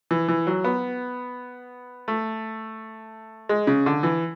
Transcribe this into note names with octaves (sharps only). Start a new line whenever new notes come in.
E3
E3
F#3
B3
A3
G#3
C#3
D3
E3